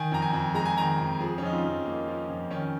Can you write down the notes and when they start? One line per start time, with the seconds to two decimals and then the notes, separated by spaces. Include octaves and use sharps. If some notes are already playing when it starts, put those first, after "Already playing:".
Already playing: D#3 G#5
0.11 F2 A#5
0.22 G#5
0.33 F2
0.54 G#3 A#5
0.66 G#5
0.77 D#3 A#5
0.98 F2
1.20 F3 G#4
1.38 C#4
1.42 F2 D#4
1.53 F4
1.64 F2
1.85 A#3 D#4
2.08 F3
2.29 F2
2.50 D#3 C#4